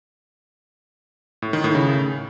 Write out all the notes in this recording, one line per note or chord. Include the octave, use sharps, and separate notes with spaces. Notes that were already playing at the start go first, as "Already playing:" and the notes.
A2
D#3
A2
C#3